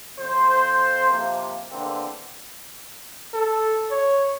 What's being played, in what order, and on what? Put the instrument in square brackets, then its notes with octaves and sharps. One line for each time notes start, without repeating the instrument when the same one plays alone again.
[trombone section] F2 C5
C3 F3 A#3
E2 D3 A#3 C4
[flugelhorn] A4
C#5